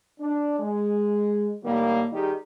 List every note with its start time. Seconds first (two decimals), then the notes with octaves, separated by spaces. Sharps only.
0.20 D4
0.59 G#3
1.63 A2 D#3 G3 A#3
2.12 D#3 G3 D#4 G4 G#4